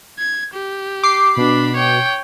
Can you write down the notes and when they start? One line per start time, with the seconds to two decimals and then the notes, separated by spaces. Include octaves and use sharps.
0.19 G#6
0.54 G4
1.03 D6 C7
1.37 B2 D4 B5
1.76 C#5 G5